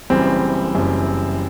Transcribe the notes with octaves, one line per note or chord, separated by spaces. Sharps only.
F#1 F#2 E3 G3 C4
F#1 F#2 E3 G3